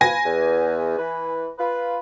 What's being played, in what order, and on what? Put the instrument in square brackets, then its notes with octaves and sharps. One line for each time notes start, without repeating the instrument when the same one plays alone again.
[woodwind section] F4 B4 [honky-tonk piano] G#5 A#6
[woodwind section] E2
E3 B4
F4 B4